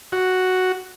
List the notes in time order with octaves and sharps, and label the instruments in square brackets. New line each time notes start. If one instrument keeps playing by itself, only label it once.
[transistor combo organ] F#4